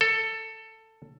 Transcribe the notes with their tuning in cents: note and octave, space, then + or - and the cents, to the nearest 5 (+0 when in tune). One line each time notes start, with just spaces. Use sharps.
A4 +15